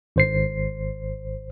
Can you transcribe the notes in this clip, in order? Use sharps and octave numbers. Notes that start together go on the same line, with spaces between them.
G#1 C5 C7